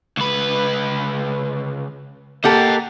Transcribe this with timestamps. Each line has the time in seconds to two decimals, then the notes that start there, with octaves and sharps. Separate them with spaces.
0.17 C#2 B4
2.44 A#3 G4 A4 D#5 F#5